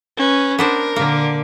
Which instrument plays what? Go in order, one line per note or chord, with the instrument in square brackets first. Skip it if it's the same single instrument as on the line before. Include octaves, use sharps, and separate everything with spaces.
[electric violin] C#4 B4
[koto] B3 D4 C5 [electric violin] A#4
[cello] A#2 D3 [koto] A#3